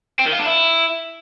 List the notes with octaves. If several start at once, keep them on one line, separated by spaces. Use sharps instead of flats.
C4
D#3
F4
D4
E4